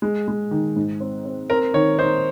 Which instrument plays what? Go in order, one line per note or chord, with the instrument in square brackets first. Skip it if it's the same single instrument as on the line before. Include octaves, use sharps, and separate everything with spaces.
[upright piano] G#3
G#3
D#3
G#2
C4
C4
[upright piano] C4 [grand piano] A#4
[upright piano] D#3 [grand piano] C#5
[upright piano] D#4 [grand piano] C5